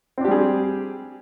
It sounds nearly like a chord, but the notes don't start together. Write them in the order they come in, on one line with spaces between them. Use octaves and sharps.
C4 D4 G4 G3 G#4